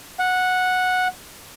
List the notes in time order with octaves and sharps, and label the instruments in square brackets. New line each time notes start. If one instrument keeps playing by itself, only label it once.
[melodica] F#5